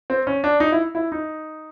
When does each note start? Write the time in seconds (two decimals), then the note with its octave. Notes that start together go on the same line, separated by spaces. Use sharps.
0.10 C4
0.27 C#4
0.44 D4
0.60 D#4
0.72 E4
0.95 E4
1.12 D#4